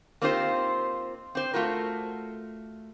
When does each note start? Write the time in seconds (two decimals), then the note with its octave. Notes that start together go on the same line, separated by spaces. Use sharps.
0.22 A#3 C4 D#4 F4 G4 C5
1.35 C4 C5
1.54 A3 F4 F#4 A#4